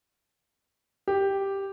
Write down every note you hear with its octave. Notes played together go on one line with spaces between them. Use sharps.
G4